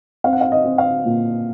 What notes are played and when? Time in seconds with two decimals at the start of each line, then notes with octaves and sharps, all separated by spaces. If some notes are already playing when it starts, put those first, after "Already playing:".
0.24 C4 F5
0.33 F#5
0.41 F5
0.52 D#5
0.65 C4
0.78 F5
1.05 A#2